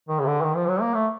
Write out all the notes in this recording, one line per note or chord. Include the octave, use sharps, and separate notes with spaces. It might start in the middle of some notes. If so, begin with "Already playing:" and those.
D#3
C#3
D3
D#3
F3
F#3
A#3
A3